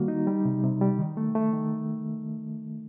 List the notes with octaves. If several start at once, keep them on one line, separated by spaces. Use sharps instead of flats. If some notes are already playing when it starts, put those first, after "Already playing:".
Already playing: D#3 G3 A#3 F#4
D#4
G3
C3
C3
G3
D#3
A3
A3
D#3